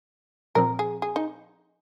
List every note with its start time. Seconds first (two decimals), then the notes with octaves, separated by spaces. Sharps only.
0.55 A#2 F3 C4 A#4
0.79 G#4
1.02 G#4
1.16 D#4